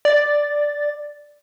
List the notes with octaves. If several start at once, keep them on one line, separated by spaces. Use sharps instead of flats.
D5 A6